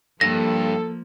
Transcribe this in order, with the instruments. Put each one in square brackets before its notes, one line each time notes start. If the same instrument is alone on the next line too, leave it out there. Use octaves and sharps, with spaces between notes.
[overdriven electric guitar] G2 [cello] F3 A#3 [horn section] A4 [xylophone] A#6